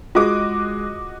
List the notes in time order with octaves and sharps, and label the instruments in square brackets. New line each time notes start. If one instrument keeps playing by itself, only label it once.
[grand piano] G#3 [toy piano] F4 G#4 [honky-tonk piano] F#4 D#5 D6